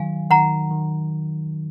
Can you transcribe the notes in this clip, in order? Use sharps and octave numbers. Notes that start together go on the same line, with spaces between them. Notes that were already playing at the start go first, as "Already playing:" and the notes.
Already playing: D#3 F#3 F5 G#5
D#3 F#5 A#5
D#3